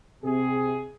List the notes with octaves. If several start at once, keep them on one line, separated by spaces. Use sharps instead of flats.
C3 G#4